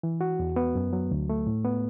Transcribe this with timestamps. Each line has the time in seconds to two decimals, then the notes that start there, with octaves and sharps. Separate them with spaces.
0.03 E3
0.21 F#4
0.39 E2
0.56 B3
0.75 F#2
0.93 F#3
1.11 D2
1.29 A3
1.47 A2
1.65 B3